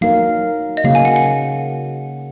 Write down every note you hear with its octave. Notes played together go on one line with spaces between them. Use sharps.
F#3 A#3 D#4 A#4 F5
D#5
C#3 F#3 A#3 F5
G#5
F#5
F#5